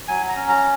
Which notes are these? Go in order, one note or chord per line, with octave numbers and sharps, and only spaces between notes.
F#3 G#5
A#5
C#4
A#5